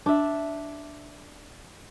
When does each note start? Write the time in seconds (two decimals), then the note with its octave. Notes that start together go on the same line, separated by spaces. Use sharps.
0.06 D4 E5